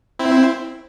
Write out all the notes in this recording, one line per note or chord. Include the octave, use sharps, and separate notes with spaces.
C4 E4